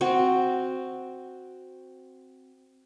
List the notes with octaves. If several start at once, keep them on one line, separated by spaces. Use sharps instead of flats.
C4 F#4